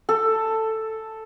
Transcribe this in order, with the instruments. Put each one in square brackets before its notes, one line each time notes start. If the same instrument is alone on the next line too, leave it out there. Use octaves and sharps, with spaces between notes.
[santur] A4